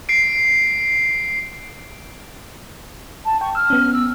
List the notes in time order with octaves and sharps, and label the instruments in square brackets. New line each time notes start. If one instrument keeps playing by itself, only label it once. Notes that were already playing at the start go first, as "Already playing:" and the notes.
[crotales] C7 D7
[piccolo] A5
[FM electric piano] G5 [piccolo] C#6
[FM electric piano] E6 [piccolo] F6
[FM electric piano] B3 C#4
[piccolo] E6